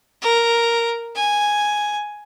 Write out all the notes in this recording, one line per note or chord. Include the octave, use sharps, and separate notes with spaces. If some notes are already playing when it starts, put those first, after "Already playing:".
A#4
G#5